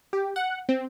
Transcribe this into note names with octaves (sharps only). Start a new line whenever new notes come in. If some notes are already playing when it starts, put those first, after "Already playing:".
G4
F#5
C4